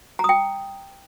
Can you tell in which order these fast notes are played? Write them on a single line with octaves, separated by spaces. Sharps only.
A#5 D#6 G5